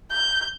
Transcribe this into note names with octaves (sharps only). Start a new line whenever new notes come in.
G6